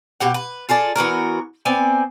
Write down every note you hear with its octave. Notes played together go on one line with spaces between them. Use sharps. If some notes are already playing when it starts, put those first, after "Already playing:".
B2 G4 F#5
B4
F4 G#4 A4 D5
E3 B3 F#4 A#4
B3 C4 D5 G#5